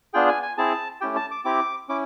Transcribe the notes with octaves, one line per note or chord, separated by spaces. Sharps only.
B3 D4 F4 G#4 G5
G#5
G#5
C4 E4 G#4 A5
A3 C#4 E4 G4 G5
A5
D6
C4 E4 G4 D6
C#4 E4 D6